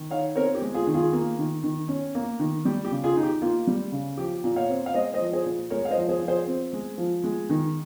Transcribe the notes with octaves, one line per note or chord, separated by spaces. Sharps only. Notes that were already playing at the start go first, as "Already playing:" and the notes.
Already playing: D#3
D#4 C#5 F5
C4 A#4 C#5
G4
G#3
F4 G#4
D#3
F4 G#4
A#3
D#3
D#3
C#4
A#3
D#3
G3 G4
G4
C#3
F4 G#4
D#4
G4
A#3 F4
G3
C#3
F3 G4
A#2
C#5 F5
C4
F5
G#3 C5 D#5
C5 D#5
F3
G#4 C5
A#2
G#3 A#4 C#5
F5
C5 D#5
F3
G#4 C5
F3
G#4 C5
C4
G#3
F3
G#3
D#3